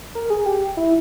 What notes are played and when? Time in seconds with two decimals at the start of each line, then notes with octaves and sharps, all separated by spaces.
0.15 A#4
0.30 G#4
0.46 G4
0.77 E4